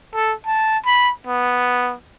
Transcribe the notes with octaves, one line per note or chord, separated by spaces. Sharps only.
A4
A5
B5
B3